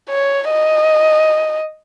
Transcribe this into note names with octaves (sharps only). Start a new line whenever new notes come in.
C#5
D#5